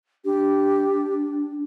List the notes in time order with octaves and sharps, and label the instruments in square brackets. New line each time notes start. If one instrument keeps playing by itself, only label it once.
[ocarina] D4 [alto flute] G4